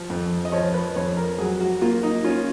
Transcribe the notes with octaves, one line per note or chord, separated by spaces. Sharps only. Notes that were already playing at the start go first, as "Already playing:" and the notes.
Already playing: F3
F2
D#5
F3 C#5
B4
F2 C#5
A#4
F#3 G#4
F#4
A#3 F4
D#4
C#4 F4